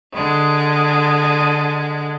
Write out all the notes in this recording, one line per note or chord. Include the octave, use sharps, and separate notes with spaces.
D3 G#3